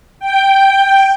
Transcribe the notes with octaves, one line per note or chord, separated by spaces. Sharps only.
G5